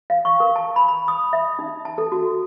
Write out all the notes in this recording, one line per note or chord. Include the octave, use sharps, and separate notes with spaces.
F5
C#6
A#4
A5
B5
B5
D#6
E5
D#4
A5
A4
F#4